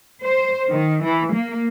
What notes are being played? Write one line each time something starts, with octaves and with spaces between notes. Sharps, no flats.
C5
D#3
E3
A#3